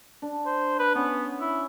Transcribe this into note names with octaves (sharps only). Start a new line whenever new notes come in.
D4
C5
B4
B3 C#4
E4